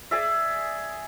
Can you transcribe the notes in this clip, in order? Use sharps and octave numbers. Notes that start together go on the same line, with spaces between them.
G#4 D5 E5